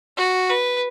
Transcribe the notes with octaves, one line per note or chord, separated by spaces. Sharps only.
F#4
B4